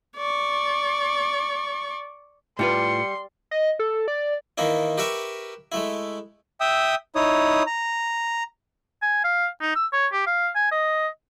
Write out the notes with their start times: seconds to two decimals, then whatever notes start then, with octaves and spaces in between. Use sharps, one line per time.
0.17 D5 C#6
2.59 A2 G3 F4 B4 C6 C#7
3.51 D#5
3.79 A4
4.08 D5
4.58 D#3 E3 A#3 D#4 E4
4.98 G4 A#4 B4 E5 C#6
5.72 G#3 A3 E4
6.60 E5 G5 D#6 E6
7.15 D#4 E4 C#5 D#6
7.67 A#5
9.02 G#5
9.24 F5
9.61 D#4
9.76 E6
9.93 C#5
10.13 G4
10.27 F5
10.55 G#5
10.72 D#5